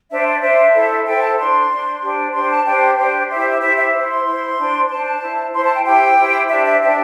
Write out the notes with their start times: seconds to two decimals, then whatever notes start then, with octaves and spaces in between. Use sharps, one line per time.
0.09 D4 C5 E5
0.25 D5
0.41 D4 C5 E5
0.73 E4 A4 C5
1.05 E4 A4 C5 G5
1.21 A5
1.37 D4 C5 C6
1.69 D4 C5
2.02 D4 G4 C5
2.33 D4 G4 C5 C6
2.49 A5
2.65 D4 G4 C5 G5
2.97 D4 G4 C5
3.29 E4 G4 C5 E5
3.40 E5
3.50 E5
3.61 E4 G4 C5 E5
3.77 E5
3.93 E4 C5
4.09 C6
4.25 E4 C5
4.56 D4 C5
4.89 D4 C5 A5
5.05 A5
5.21 E4 C5
5.53 E4 C5 C6
5.63 A5
5.74 G5
5.85 E4 G4 C5 G5
6.17 E4 G4 C5
6.48 D4 G4 C5 E5
6.65 E5
6.81 D4 G4 C5 E5